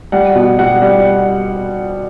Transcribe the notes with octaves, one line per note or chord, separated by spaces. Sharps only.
G3 F#5
B2
G3 F#5
G3